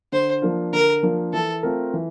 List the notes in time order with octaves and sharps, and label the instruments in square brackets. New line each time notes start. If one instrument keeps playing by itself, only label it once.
[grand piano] D3 [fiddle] C5
[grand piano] F3 A#3 D4 F4
[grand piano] D3 [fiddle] A#4
[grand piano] F3 A#3 D4 F4
[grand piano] E3 [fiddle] A4
[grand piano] A3 C4 F4 A#4
E3